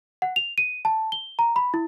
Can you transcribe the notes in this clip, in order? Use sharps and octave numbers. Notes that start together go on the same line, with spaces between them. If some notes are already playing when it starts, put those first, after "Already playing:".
F#5
F7
D#7
A5
G7
A#5
B5
E4